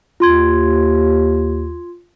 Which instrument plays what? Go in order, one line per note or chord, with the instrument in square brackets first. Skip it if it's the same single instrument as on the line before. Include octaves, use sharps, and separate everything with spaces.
[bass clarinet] D#2 [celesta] F4 C6 G#6